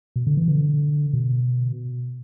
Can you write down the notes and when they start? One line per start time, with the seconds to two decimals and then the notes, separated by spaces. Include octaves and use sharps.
0.16 B2
0.27 D3
0.37 E3
0.48 D3
1.13 B2